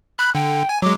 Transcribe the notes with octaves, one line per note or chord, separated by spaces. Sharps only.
B5 F#6
D3 G5
G#5
F#3 G#3 D6